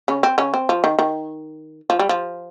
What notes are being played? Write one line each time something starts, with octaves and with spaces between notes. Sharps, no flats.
C#3 C#4
C4
C#3 C#4
C4
F3
D#3
D#3
F3
G3
F3